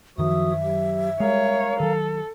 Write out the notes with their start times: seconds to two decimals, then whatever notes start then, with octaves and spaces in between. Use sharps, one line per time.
0.18 F#2 D#3 F3 F#4 E5 D#6
0.63 F#3 G4
1.20 G3 G#3 A#4 C#5 F5 A#5
1.80 D#3 F#3 A4